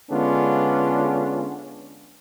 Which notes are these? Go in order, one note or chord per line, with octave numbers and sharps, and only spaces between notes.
D3 G#3 B3 C#4 D4 F4